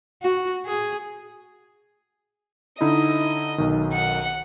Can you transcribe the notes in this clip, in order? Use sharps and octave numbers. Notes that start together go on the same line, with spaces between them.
F#4
G#4
D3 D#4 E4 D#5
B1 D#3
F#5 C#7